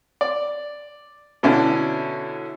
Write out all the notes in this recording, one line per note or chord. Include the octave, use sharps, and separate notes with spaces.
D5
B2 D3 C#4 D4 E4 A4